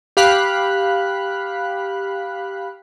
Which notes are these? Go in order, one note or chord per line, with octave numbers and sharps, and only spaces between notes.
G4 F5 B5 F#6